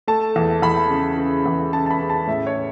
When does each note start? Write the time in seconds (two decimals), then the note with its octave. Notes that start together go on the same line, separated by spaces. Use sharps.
0.08 A3 A5
0.36 E2
0.62 E2 B5
0.90 C#3
1.17 C#3
1.46 E2
1.72 C#3 A5
1.86 A5
1.91 B5
2.01 C#3
2.10 A5
2.27 A2 E5
2.47 C#5
2.56 C#4